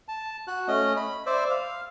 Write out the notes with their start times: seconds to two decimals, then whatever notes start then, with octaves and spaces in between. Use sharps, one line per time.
0.08 A5
0.47 F#4 F#6
0.68 A3 C#4 D#5
0.96 B5
1.26 C5 D5 E5
1.50 F5